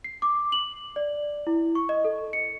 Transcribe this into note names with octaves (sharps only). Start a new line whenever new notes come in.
C7
D6
F#7
D5
E4
C#6
D#5
A4
C#7